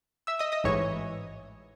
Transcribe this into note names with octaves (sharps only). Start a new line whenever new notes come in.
E5 E6
D#5 D#6
D#5 D#6
A1 G#2 E3 C#5 C#6